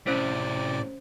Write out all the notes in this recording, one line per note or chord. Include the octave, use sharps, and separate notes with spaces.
A2 C3 C#4 C5 D5 B6